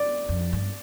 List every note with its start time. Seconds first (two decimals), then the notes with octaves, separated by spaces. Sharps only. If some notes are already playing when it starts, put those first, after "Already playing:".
Already playing: D5
0.29 F2
0.53 G2